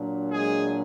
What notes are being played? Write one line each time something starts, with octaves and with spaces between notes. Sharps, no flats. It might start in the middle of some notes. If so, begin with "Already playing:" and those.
Already playing: A#2 F#3 D4
G#3 G#4